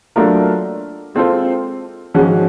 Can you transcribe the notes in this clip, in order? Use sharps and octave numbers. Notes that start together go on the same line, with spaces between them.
F#3 A3 D4 F4 A#4
G#3 C4 F4 A4 C5
G#2 F3 G#3 C#4 F#4